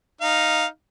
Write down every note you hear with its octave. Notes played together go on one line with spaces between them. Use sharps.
D#4 F5